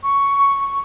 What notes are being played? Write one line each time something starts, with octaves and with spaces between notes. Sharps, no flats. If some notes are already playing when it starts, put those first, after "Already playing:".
C#6